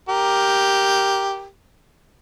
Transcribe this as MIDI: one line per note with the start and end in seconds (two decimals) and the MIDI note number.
0.09 1.46 67
0.09 1.46 70